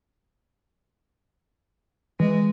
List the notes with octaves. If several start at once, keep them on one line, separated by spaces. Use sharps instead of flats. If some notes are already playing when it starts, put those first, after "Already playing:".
E3 G#3